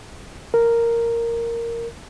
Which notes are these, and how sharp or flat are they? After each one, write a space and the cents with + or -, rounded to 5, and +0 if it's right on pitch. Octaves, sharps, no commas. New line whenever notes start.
A#4 -5